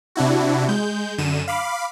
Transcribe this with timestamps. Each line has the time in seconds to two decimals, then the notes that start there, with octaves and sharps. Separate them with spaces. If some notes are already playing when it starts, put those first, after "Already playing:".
0.16 C3 D4 E4 F#4
0.68 G#3 G6
1.18 F#2 D3 D#7 E7
1.48 F5 B5 D6